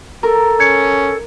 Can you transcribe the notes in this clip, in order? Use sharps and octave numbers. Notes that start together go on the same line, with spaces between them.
A4 A#4
C#4 G#6 C#7